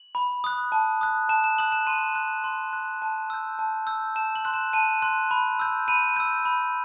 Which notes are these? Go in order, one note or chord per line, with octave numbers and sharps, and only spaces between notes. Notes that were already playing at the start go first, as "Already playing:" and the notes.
Already playing: F#7
B5
D#6 F#6
A5
D#6 F#6
A5 E7
E7
D#6 F#6 F#7
E7
C6 D#7
F#6
C6
F#6
A5
E6 G6
A5
E6 G6
A5 E7
F#7
C6 F#6
E7
A5 D#7
C6 F#6
B5
E6 G6
B5 D#7
E6 G6
B5